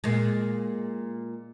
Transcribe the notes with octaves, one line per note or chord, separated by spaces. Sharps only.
A#2 G#3